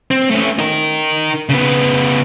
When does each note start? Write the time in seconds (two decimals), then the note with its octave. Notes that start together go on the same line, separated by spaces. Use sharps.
0.11 C4
0.31 A3 C#4
0.59 D#4 A#4
1.49 C#3 B3